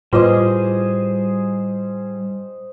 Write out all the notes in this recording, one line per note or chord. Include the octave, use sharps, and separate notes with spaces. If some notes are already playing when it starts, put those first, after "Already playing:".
A2 G3 F4 G#4 B4 C5 D#5 D6